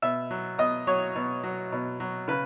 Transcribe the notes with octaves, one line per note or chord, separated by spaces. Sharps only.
B2 E5
F#3
B2 D#5
F#3 C#5
B2
F#3
B2
F#3
C#3 B4